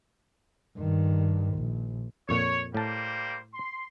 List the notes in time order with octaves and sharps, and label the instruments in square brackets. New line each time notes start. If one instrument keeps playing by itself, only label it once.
[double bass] G2 D#3
A#1
[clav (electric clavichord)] F2 A#2 [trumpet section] C#5
[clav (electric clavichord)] A2 A5 [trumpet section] G3 A#3 C5
[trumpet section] C6